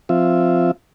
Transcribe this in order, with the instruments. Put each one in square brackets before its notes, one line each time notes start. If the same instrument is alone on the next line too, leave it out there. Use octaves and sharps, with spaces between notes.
[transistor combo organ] F3 C4 F4 E5